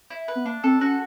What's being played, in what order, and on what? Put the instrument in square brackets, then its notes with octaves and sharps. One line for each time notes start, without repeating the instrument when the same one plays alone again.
[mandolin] E4
B4
[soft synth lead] B3
[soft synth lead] A#3 [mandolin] D4
[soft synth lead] C4 [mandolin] A4
[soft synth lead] C#4 [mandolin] F#4